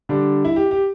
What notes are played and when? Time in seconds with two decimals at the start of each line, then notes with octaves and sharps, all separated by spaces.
0.09 D3 G3 D4
0.45 E4
0.56 G4
0.71 G4